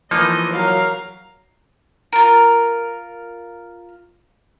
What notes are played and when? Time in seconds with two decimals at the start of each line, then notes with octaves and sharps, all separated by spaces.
0.11 E3 F3 A#3 D#4 D#5
0.53 F#3 A#4 F5
2.13 F4 A#4